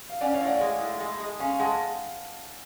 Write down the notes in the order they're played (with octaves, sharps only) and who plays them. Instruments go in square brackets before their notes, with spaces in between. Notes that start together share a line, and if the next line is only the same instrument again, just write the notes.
[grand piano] F5
[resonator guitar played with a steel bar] C#4 [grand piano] D5 F#5
[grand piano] C#5 F5
[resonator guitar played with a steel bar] A2
[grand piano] D5 F#5
[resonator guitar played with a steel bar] G#3
A2
G#3
G#3
[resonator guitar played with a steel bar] C#4 [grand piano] F5 G#5
[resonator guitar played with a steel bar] G#3 [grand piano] F#5 A5